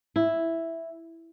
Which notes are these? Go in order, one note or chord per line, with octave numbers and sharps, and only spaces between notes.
E4